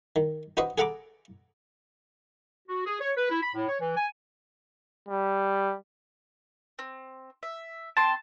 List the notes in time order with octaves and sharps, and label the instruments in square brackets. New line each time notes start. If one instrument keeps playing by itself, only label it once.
[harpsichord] D#3
D4 F#4 B4 C5 D#5
G#4 A4 F#5 A#5 B5 D6
[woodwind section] F#4
G#4
C#5
B4
E4
B5
A2
C#5
E3
G#5
[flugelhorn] G3
[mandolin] C4
E5
[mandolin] C4 G5 C6 [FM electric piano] A5